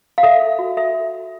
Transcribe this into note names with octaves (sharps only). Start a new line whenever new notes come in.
F5
A4 E5
A4
F#4
A4 E5